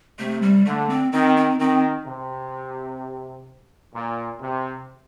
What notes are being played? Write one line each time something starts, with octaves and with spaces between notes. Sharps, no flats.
C3 A3
G3
D3 A3
C4
D#3 C4
C4
D#3 C4
C3
A#2
C3